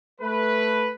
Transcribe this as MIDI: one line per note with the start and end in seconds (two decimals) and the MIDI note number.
0.21 0.93 57
0.21 0.93 71